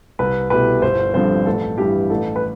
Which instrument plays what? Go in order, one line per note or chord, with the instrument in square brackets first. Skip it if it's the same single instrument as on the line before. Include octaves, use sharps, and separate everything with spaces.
[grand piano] C2 [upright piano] B4
[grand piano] B2 A3 E4 G4 [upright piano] B4
[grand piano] G1 [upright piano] C5
[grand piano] G2 D3 F3 C4 [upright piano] C5
[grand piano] A1 [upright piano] A4
[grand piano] G2 E3 [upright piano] G4
[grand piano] A1 [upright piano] A4
[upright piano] B4